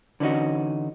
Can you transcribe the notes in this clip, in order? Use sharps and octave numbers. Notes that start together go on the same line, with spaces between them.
D3 E3 C#4 D#4 F#4